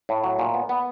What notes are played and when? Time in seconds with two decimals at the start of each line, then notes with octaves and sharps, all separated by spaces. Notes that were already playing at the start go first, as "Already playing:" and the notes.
0.09 A2
0.24 F#3
0.39 A#2
0.54 B3
0.69 B3